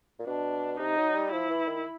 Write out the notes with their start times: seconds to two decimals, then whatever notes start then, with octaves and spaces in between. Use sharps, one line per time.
0.19 A#2
0.27 B2 D4
0.79 C3 D#4
0.97 F#3
1.15 G3
1.32 F3 E4
1.49 E3
1.68 D#3